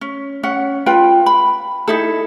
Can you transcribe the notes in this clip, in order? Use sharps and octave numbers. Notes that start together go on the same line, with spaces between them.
C#4
C#4 F#5
F4 B4 G5
B5
D#4 E4 A4